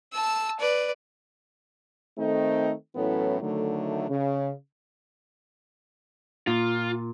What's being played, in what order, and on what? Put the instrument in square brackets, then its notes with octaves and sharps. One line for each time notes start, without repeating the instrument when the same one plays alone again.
[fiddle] A5 E6
B4 D5
[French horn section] D#3 A3 C4 D#4 A4
A2 E3 F#3 B3 C#4 A4
D3 D#3 F#3 A3
C#3
[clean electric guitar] A#2 [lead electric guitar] F4